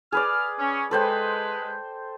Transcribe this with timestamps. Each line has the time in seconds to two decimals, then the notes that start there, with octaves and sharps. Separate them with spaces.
0.12 G#4 B4 D5 F6
0.59 C#4
0.91 G#3 A4 B4 C5 G5